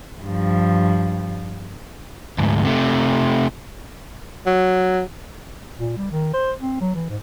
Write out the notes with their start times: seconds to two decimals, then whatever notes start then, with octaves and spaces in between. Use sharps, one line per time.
0.22 G2 F3
2.38 D2 G#2
2.65 C3 A3
4.46 F#3
5.78 A#2
5.97 G3
6.11 D#3
6.34 C5
6.60 C4
6.81 F#3
6.95 E3
7.09 G#2